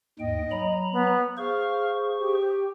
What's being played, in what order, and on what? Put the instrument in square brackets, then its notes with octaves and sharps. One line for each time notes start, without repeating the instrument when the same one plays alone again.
[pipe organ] D#2 G#2 G5 [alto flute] D#5
[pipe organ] F#3 A#5 B5
[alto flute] B3
[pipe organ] G#4 C5 C#6 [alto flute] F5
[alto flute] G4